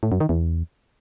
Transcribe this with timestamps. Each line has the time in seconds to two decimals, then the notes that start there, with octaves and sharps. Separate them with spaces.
0.03 A2
0.12 F#2
0.20 D#3
0.29 E2